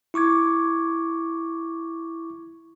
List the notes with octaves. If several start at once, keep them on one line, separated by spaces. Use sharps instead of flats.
E4 C#6 D6 G#6